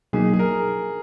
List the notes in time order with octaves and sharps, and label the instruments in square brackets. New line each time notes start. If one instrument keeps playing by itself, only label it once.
[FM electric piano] B2 F#3 A#3 D#4 [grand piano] G#4
[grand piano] G#4
A#4